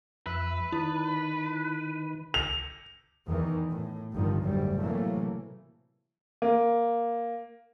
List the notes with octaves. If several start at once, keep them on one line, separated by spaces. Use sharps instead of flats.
F2 B4 E5
D#3 E4
F7
E2 D#3 E3
A2
G1 G2 D3 D#3 F3
F#1 D2 G#2 F#3 G3
A2 C3 E3 F#3 A3 A#3
A#3